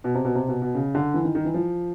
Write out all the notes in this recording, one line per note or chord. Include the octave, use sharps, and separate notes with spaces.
B2
C3
B2
C3
B2
B2
C#3
D3
E3
D#3
D#3
E3
F3